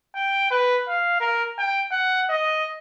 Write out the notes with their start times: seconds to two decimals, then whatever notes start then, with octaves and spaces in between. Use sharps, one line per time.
0.16 G5
0.51 B4
0.88 F5
1.20 A#4
1.59 G5
1.92 F#5
2.30 D#5